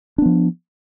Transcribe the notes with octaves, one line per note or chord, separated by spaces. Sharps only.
F3 B3 D4